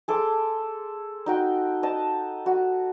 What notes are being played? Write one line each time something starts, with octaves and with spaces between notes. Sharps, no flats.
G#4 A4 C6 D6
D#4 F#4 G5
D#5 A5
F#4